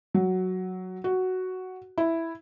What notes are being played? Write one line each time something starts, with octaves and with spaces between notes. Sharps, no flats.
F#3
F#4
E4